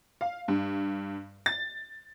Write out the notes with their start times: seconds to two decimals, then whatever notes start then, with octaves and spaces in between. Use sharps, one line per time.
0.21 F5
0.48 G2
1.46 A6